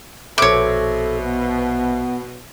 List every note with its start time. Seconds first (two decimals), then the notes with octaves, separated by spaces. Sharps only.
0.38 A#1 B2 A4 C5 C#5 E5 D6
1.22 B3